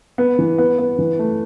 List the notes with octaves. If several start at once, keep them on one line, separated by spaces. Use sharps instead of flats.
B3
E3
B3
B3
E3
A3